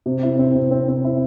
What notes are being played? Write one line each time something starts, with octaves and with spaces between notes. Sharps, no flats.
C3
E4
C4
C3
C4
C4
E4